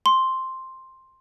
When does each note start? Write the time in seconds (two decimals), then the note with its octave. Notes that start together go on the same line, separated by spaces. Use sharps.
0.06 C6